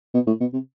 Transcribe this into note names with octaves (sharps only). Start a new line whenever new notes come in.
B2
A2
B2
C3